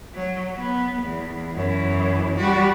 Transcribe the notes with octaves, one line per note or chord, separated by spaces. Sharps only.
F#3
B3
E2
F#2 E3
G3 F#4